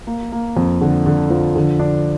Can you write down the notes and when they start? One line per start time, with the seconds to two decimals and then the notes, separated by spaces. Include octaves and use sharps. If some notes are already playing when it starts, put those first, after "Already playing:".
0.07 A#3
0.32 A#3
0.57 F2
0.81 D3
1.06 D3
1.30 F3
1.56 D3
1.79 D4